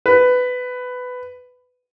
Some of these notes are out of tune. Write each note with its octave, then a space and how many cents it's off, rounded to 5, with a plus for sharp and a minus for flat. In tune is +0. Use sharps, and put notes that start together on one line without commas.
B4 +15